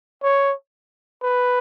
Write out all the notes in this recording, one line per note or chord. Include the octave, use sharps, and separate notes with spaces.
C#5
B4